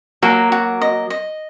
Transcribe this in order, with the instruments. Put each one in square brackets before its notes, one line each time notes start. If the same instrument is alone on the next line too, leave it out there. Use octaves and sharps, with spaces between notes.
[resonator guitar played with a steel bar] F#3 A#3 [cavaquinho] F#4
[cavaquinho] F#4
D#5
D#5